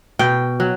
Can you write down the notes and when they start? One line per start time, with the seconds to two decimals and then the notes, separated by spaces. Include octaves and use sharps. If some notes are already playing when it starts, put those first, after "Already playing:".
0.19 B2 G5
0.60 F#3